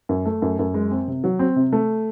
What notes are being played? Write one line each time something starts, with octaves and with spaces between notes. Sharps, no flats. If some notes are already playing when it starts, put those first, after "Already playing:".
F#2
A3
F#2
F#2
G#3
C4
C3
F#3
C4
C3
A3